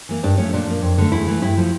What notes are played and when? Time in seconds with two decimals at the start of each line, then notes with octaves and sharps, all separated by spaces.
0.09 E3 A#3
0.23 G2 D4
0.38 F3 A3 C#4
0.53 A#2 D4
0.67 F3 A#3
0.82 F2
0.98 D3 A3
1.12 E2 E4
1.27 E3 A3
1.42 G2 E4
1.57 F3 A3